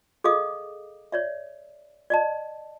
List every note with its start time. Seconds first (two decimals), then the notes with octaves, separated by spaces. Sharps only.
0.24 G#4 A4 D#5 F5 D6 D#6
1.12 C#5 D5 E5
2.10 D5 D#5 A5